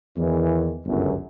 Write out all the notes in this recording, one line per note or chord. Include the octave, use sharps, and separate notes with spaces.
E2 D#3 E3
G1 C#2 F#2